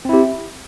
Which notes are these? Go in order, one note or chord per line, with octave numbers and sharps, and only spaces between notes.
C4 E4 G4